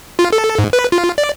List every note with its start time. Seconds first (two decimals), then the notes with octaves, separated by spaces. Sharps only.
0.19 F4
0.33 A4
0.59 G#2
0.73 B4
0.92 F4
1.18 D5